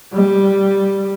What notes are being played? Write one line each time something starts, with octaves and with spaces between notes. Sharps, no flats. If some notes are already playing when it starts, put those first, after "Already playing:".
G3